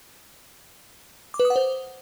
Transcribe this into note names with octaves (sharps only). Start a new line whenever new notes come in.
D6
B4
D#6
F#5
C5